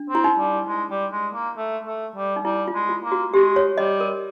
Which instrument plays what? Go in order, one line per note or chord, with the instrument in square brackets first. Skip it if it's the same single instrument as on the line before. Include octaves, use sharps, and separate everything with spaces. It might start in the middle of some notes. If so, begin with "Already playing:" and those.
Already playing: [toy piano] D4
[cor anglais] C4
[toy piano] E4
D#4
[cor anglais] G3
G#3
G3
G#3
A#3
A3
A3
G3
[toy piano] D#4
[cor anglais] G3 [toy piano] E4
[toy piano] F4
[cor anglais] G#3
[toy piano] F4
[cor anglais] A#3
[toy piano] F#4
[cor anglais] G#3 [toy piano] G4
[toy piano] C#5
[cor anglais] G3 [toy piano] D#5
[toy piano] A#4